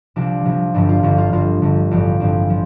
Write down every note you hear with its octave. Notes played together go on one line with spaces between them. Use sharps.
C2 C3 F3 D4
C2 C3 F3
G1 G2 F3 D4
F4
G1 G2 F3 F4
F4
G1 G2 F3 F4
G1 G2 F3
A1 G2 F3 G4
A1 G2 F3 C4
F3